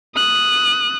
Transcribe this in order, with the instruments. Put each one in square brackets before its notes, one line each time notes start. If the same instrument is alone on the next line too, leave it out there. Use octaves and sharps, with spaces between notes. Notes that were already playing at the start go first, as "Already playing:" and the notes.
[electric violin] D#6 F#6